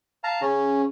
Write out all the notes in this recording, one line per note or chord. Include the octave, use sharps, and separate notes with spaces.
F5 A5 A#5
C#3 C#4